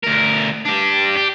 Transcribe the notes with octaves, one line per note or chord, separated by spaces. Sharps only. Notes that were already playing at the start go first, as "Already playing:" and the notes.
D2 A#4
D4 G4
G4